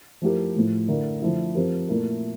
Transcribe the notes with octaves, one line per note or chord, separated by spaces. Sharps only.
F3 A3 E4 G4 A#4
A2 F3 A3
D3 A3 E4 A#4
D3 F3 A3 E4
F3 C4 G4 A#4
A#2 A3 E4 A#4